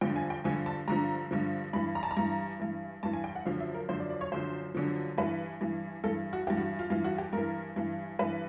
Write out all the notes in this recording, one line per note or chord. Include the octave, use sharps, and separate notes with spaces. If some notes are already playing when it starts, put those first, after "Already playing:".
G2 D3 F3 G5
G#5
G5
G2 D3 F3 G#5
A5
G2 D3 F3 A#5
G2 D3 F3
G2 E3 B5
A#5
A5
A#5
G2 E3
G2 E3
G2 E3 A5
G#5
G5
F#5
F#2 D3 F3 F5
E5
A#4
F#2 D3 F3 C5
D5
D5
C#5
F#2 D3 F3 C5
F#2 D3 F3
G2 E3 B4
G2 E3
G2 E3 A4
F#4
G2 E3 G4
F#4
F4
G2 E3 F4
F#4
G4
G2 E3 A#4
G2 E3
G2 E3 B4